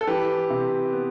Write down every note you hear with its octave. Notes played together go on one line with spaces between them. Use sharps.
A4
E3 G4 B4
C3
B3